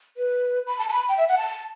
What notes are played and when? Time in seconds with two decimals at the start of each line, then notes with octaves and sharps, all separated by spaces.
0.17 B4
0.67 B5
0.78 A5
0.89 A5
0.92 B5
1.09 G5
1.17 E5
1.28 F#5
1.38 A5